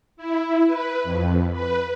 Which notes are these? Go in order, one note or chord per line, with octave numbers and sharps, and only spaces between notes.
E4
B4
F2
B4